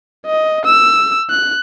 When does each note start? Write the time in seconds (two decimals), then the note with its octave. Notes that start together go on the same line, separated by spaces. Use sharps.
0.26 D#5
0.65 E6
1.30 F#6